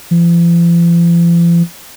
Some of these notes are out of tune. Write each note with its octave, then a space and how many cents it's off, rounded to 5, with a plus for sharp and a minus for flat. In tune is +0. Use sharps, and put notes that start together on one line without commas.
F3 -45